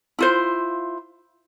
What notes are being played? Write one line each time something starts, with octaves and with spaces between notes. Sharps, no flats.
E4 F4 C5